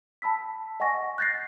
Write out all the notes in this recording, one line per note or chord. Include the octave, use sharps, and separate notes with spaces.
A5 B5 E6 B6
D#5 F#5 G#5 C#6 A#6
F#6 G6 A6 A#6 C7